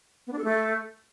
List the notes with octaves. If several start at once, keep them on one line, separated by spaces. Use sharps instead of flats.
B3
D4
A4
A3